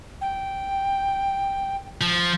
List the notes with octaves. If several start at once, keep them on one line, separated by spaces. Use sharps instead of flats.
G5
F3